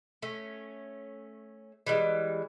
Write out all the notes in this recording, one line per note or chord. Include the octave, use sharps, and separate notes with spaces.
A3 C#4
E3 G3 G#3